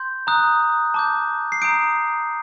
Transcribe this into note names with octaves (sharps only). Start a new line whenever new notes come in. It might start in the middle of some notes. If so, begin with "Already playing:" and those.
Already playing: C6 G6
A#5 D#6 F#6
A5 D6 G6
C7
A#5 D#6 G6 D7